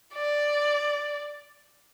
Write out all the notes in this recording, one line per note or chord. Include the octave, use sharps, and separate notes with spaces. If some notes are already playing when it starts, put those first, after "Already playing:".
D5